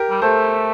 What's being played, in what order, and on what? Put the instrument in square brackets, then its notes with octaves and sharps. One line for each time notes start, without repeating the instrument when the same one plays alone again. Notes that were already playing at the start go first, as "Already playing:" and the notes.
Already playing: [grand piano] G4 A#4
[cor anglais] G3
[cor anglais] A3 [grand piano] A4 C5